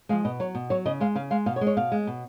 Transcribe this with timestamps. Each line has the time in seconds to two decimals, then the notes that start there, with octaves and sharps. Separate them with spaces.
0.09 F3 G#3 F5
0.25 B2 D#5
0.40 F#3 C#5
0.55 B2
0.70 F#3 C#5
0.85 C#3 D#5
1.00 G#3 F5
1.15 C#3 F5
1.31 G#3 F5
1.46 B2 F5
1.56 C#5
1.61 G#3
1.67 C#5
1.77 B2 F5
1.92 G#3
2.07 B2